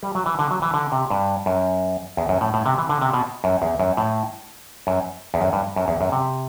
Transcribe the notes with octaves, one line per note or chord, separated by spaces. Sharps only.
G3
F#3
E3
D3
F#3
E3
D3
C3
G2
F#2
E2
F#2
A2
A2
C3
E3
D3
C3
B2
F#2
E2
F#2
A2
F#2
E2
F#2
G2
F#2
E2
F#2
C3